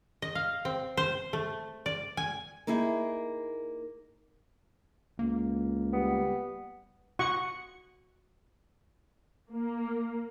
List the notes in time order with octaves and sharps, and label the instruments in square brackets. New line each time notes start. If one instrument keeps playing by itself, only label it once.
[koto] D#5
F5
C4
C5
A3
D5
G#5
[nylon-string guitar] A#3 D#4 E4 G#4
[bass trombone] C#2 [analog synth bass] A#3
[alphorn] G3 [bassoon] B3
[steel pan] F#4 F#5 C#6
[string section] A#3